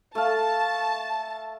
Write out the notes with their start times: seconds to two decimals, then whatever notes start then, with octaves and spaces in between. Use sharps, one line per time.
0.15 A3 F5 A5